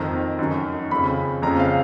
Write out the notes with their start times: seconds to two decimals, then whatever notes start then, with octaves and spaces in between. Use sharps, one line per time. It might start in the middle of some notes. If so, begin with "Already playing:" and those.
Already playing: F2 D#3 A#5
0.39 F#2 D#3
0.90 F2 C#3 B5
1.42 F2 A#5
1.46 C#3
1.59 F5